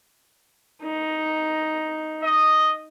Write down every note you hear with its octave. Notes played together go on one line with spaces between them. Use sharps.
D#4
D#5